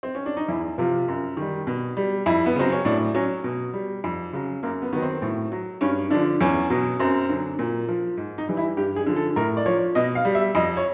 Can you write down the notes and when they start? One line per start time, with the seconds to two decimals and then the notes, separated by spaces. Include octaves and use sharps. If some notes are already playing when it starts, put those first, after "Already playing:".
0.03 C4
0.15 C#4
0.26 D4
0.37 D#4
0.48 E2 E4
0.78 C3 F3 F4
1.08 F#2
1.37 D#3 G3
1.67 B2
1.97 G3
2.26 F2 E4
2.46 B3
2.56 C#3 F#3 C4
2.72 C#4
2.85 A2 D4
3.14 F#3 C#4
3.44 B2
3.74 G3
4.04 F2
4.33 C#3 F#3
4.63 F#2 A#3
4.82 B3
4.93 D#3 F#3 B3
5.02 C4
5.22 A2
5.52 F#3
5.81 G2 C#4
6.10 D3 F3 D4
6.41 E2 C#4
6.70 B2 F#3
6.99 F#2 C4
7.29 D3 F#3
7.59 A#2
7.89 F3
8.17 G#2
8.38 D#4
8.48 E3 G3
8.57 E4
8.77 G2 G4
8.96 G#4
9.06 D3 F3
9.16 A4
9.36 A2 A#4
9.57 D5
9.66 F3 C#5
9.95 B2 D#5
10.15 F5
10.25 G3
10.35 E5
10.55 F2 D#5
10.77 C#5